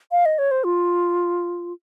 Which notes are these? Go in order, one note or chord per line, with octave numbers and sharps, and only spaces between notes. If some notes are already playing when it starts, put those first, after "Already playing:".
F5
D#5
C#5
C5
F4